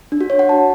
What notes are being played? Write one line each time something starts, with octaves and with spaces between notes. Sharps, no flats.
D4
F#4
C#5
F#5
A5